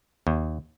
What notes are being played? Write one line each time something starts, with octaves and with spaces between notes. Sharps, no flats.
D#2